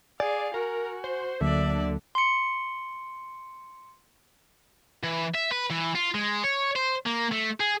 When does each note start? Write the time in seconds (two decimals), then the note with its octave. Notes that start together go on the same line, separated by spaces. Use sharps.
0.20 G#4 D5 F5 G#5
0.54 F#4 A#4
1.04 C5
1.41 D2 D3 F#3 A#3 D5 E5
2.15 C6 C#7
5.04 E3
5.34 E5
5.52 B4
5.70 E3
5.95 F4
6.15 G#3
6.44 C#5
6.76 C5
7.06 A#3
7.32 A3
7.60 G#4